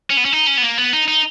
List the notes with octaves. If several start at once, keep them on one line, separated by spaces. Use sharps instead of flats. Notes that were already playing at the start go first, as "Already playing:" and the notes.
C#4
B3
C#4
D#4
C#4
B3
A#3
B3
D#4
D#4